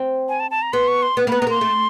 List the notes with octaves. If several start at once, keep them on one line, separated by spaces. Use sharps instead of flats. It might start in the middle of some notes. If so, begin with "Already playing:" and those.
Already playing: C4
G#5
A5
A5
A#5
B3 C6
C#6
C6
B3
A#3 B3 B5
B3 A#5
A#3 C6
A3